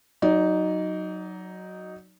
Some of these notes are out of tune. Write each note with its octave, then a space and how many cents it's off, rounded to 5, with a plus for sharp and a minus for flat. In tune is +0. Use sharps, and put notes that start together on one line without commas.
F#3 +0 D#4 +0 D5 -35